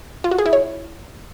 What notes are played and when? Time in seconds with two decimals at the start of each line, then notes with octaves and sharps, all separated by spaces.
0.24 F4
0.31 F#4
0.38 G#4
0.46 E4
0.53 C#5